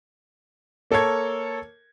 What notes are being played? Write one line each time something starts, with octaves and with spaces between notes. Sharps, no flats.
A#3 A4 A#4 C#5 G#6